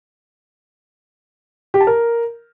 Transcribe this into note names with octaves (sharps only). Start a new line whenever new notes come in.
G4
A5
A#4